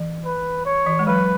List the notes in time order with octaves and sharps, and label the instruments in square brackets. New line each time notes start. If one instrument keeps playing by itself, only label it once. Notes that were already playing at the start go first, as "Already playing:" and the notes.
Already playing: [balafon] E3
[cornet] B4
C#5
[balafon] E3
G#3
[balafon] F#3 [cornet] B4